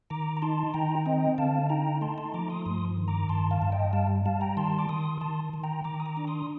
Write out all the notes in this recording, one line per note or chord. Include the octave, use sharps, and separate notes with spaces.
D#3 A#5 D6
A#5
D#4 A5 C6
D#3 G5 A#5
C4 D#5 G5
D3 F5 A5
D#4 G5 A#5
A3 A5 C6
A5 C6
F3 A#5 D6
C6 D#6
G2 C6 D#6
D#3
A#5 D6
G2 A5 C6
F5 A5
G2
D#5 G5
G3 F5 A5
G3 F5 A5
G5 A#5
D#3 A5 C6
D6
D#3 C6 D#6
D#3 A5 C6
D#3
G5 A#5
D#3 A#5 D6
D#6
A#5 D6
D4
C6 D#6